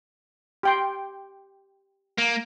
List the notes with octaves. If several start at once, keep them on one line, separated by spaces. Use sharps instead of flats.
G4 G5 C6
A#3